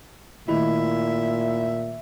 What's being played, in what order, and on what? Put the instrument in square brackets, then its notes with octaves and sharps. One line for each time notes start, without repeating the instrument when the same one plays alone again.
[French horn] A#2 [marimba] D#3 A3 [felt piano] E4 [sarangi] E5